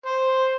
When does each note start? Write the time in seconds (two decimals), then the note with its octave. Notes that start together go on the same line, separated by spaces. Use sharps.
0.06 C5